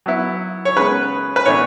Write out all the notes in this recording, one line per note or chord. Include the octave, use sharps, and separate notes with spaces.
F#3 B3 E4
C#5
C#3 G#3 B3 B4
B4
A2 E3 B3 D4 C#5